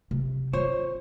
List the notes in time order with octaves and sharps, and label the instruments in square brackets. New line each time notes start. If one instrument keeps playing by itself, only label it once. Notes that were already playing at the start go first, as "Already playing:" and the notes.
[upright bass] C3
[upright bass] F4 [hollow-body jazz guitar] C5 C#5